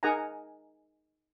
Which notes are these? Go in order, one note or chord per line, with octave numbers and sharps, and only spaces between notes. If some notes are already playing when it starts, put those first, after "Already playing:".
D#4 G#4 A#4 F#5 G#5 A#5